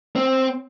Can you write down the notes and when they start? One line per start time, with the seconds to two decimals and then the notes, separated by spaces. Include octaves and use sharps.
0.16 C4